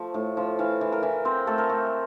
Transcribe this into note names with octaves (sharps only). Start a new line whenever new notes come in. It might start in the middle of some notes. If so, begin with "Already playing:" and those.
Already playing: F3 A3
A2
F3
E3 F5
E3
A#4
E3
C4 C5
A3 A4
A#4
A3